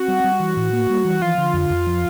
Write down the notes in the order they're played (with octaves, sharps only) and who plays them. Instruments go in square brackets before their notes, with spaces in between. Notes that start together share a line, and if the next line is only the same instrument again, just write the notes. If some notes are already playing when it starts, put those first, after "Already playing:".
Already playing: [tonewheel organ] C4 [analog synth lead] F#4
[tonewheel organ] G3
G3
E3
A2
A#3
G3
E3
[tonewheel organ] F3 [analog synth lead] F4
[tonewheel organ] D3
F2
F2
F3